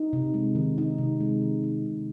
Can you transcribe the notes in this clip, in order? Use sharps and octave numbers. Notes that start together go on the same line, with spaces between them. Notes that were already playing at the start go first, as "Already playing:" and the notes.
Already playing: D#4
C3
G#3
D#3
D#4
C3
G#3
D#3
D#4
C3